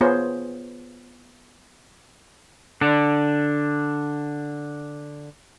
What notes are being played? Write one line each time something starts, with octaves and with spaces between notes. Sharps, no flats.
B3 F4 G#4 C5 C#5
D3 D4